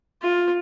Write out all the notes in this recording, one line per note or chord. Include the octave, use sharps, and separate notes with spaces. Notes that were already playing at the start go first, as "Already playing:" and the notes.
F4